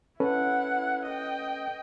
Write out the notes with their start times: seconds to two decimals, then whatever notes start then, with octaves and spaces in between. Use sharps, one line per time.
0.20 C#4 E4 A4 B4 F#5
1.06 D#5 G5